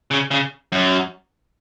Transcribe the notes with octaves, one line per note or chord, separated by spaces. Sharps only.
C#3
C#3
F#2